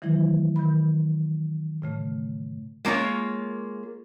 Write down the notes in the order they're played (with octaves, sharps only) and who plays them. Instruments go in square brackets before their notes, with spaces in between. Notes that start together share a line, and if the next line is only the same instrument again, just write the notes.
[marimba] D#3 E3 F#3 A3 E4
D#3 B5
A2 C#3 A3
[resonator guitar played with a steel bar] G#3 A#3 F4 C#5